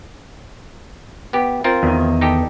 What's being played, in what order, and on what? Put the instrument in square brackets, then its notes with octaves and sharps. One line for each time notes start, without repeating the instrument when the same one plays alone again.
[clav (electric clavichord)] B3 G4
C4 F4 A#4
[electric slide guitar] E2 D#3
[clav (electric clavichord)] D#4 G4 A4